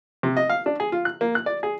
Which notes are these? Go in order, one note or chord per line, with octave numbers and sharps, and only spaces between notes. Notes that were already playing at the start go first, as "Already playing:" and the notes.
C3
D#5
F5
D4
G#4
F4
F#6
A#3
F#6
D5
G#4